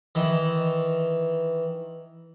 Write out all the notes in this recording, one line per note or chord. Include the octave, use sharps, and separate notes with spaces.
D#3 E3